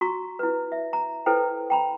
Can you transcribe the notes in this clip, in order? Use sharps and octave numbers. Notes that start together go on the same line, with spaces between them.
F#4 A#5 C#6
E4 B4
E5
A#5
E4 A4 B4 C5 G5
G5 A#5 B5